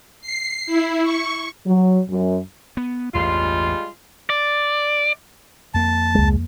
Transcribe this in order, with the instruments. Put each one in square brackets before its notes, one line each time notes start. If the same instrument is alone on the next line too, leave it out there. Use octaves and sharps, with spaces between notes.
[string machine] C7
E4
C#6
[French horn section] F#3
F#2
[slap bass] B3
[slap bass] A1 E2 G2 [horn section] G3 G#3 F4
[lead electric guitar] D5
[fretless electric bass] F2 A#3 [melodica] A5
[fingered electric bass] C#2 G#3